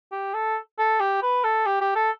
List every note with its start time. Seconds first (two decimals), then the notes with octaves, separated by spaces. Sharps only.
0.12 G4
0.34 A4
0.78 A4
1.00 G4
1.23 B4
1.44 A4
1.66 G4
1.81 G4
1.96 A4